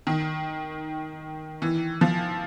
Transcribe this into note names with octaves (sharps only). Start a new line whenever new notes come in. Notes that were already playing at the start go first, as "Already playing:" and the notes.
D#3
E3
F3